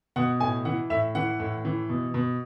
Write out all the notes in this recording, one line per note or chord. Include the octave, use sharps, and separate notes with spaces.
B2 F#5
A2 G#5
E3 F#5
A2 E5
E3 F#5
A2
E3
B2
B2